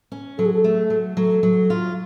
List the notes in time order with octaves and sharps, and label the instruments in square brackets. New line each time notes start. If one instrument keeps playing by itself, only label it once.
[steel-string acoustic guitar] C#4
[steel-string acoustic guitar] F#3 [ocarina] A4
[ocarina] G#4
A4
[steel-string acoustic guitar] A3
F#3
[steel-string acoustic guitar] F#3 [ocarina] A4
[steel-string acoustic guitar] F#3
F4